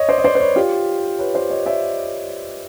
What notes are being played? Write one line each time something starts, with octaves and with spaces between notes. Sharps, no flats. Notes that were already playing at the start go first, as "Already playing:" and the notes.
Already playing: C#5 D#5
C5 D5
D#5
C5 D5
C5
B4 C#5
F4 G4
B4 C#5
C5 D5
C#5 D#5
D5 E5